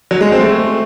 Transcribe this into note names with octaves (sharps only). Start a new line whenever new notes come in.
F#3
G#3
C4
A3